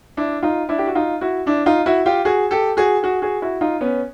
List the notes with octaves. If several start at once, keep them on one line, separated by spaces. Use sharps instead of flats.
D4 E4
D#4 F4
D4 E4
G4
F#4
D#4 F4
E4 F#4
D4 E4
D#4 F4
E4 F#4
F4 G4
F#4 G#4
G4 A4
F#4 G#4
F#4 G#4
F#4 G#4
E4 F#4
D#4 F4
B3 C#4